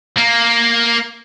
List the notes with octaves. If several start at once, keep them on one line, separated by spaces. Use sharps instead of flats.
A#3